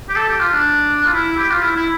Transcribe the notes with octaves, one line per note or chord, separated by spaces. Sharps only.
G4
A4
G4
F4
D4
F4
E4
G4
F4
E4
E4